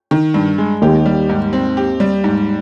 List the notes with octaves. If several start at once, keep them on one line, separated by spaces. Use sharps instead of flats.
D#3
G2
G#3
D#2 D#3 G4
G3
G#2
C4
G4
G3
G#2